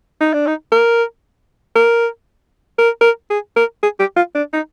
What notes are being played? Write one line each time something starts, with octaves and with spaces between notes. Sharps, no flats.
D#4
D4
D#4
A#4
A#4
A#4
A#4
G#4
A#4
G#4
G4
F4
D4
D#4